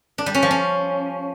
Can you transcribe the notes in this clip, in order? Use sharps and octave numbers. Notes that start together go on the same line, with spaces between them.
D4
G3
C#4
F3
C#4